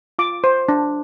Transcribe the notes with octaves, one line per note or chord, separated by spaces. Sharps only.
F4 D6
C5
D4